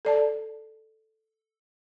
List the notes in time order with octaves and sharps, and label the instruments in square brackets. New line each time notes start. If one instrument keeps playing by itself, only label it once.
[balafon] A4 D5 A5